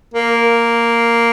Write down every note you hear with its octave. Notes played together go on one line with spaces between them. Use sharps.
A#3